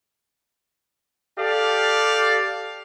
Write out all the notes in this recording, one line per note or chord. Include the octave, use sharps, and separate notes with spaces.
G4 A4 D5 F5